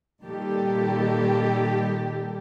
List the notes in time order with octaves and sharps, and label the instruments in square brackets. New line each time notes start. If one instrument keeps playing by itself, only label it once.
[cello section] A#2 D#3 G3 G4 A4